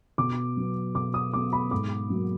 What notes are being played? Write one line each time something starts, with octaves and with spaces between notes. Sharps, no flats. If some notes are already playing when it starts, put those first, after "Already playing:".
B2 D6
F#3 B3
B2 D6
D#6
F#3 B3 D6
B5
G#2 D6
F#3 A#3